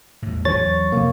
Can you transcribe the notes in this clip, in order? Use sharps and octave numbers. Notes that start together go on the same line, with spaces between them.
E2 A2
E2 E3 F#3 C#5 A6
F2 C3 A#3